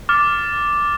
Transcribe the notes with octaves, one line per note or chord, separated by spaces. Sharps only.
D6 F6 A6